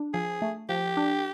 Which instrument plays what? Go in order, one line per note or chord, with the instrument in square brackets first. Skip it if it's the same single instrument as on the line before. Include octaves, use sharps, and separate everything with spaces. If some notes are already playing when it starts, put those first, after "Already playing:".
Already playing: [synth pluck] D4
[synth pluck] F3 [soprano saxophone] G#4
[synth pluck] A3
[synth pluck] F3 [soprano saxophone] G4
[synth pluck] D4